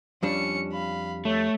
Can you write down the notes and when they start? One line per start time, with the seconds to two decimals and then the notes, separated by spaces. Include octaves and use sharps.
0.23 F2 G3 C#4 D4 C#7
0.72 F5 B5
1.25 A3 C#5